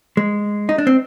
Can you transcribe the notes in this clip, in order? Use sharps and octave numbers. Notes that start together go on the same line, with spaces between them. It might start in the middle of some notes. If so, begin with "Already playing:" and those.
G#3
D#4
D4
C4